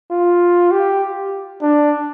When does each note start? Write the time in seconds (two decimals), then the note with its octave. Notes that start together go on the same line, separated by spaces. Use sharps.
0.11 F4
0.71 G4
1.62 D4